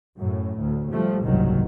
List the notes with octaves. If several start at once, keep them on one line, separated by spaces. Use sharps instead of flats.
F#2 A2
D2
F3 G3 A3
F#1 C2 G#2 D#3 F#3